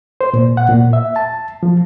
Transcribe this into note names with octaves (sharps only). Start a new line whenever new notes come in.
C5
A#2
F#5
A#2
E5
A5
F3